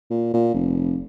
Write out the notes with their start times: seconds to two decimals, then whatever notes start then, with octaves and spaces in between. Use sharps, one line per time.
0.10 A#2
0.34 A#2
0.54 F1